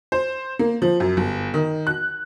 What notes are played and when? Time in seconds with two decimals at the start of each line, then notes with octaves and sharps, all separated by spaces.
0.12 C5
0.59 A#3
0.82 F3
1.00 F#2
1.17 G1
1.54 D#3
1.87 F#6